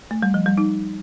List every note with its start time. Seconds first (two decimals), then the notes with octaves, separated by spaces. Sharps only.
0.11 A3
0.23 G3
0.34 F3
0.46 G3
0.58 D#4